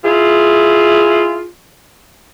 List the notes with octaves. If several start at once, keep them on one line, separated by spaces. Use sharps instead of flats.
E4 F4 G#4